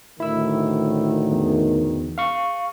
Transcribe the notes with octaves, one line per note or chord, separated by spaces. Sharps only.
D2 A2 D#3 E4 E6
E2
F5 C#6